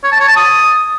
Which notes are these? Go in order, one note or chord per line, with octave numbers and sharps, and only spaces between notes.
C#5
A5
C#5
A5
D#6